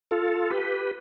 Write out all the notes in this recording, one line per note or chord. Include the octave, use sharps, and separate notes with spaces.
F4 A4
G4 B4